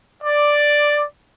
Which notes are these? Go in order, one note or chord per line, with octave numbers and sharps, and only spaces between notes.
D5